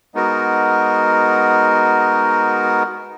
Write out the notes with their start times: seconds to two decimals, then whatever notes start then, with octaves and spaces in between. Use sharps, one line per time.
0.15 G#3 B3 D#4 F#4 A#4